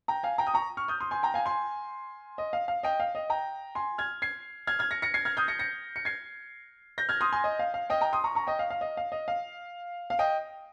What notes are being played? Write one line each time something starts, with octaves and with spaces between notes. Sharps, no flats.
G5 A#5
F5 G#5
G5 A#5
D#6
A#5 C#6
C#6 F6
D#6 G6
C6 D#6
G#5 C6
G5 A#5
F5 G#5
G#5 C6
D#5
F5
F5
D#5 G5
F5
D#5
G5 A#5
G#5 C6
F6 G#6
G#6 C7
F6 G#6
F6 G#6
A#6 C#7
A#6 C#7
G#6 C7
F6 G#6
D#6 G6
A#6 C#7
A#6 C#7
C#7
G#6 C7
G6 A#6
F6 G#6
C6 D#6
G#5 C6
D#5
F5
F5
D#5 G5
G5 A#5
C6 D#6
A#5 C#6
A#5 C#6
D#5 G5
F5
F5
D#5
F5
D#5
F5
F5
D#5 G5